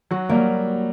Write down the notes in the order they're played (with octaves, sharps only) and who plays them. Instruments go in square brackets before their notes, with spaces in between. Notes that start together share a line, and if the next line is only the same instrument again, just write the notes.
[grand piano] F#3 [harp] F#4
[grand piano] G3 [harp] A#3
[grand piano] F#3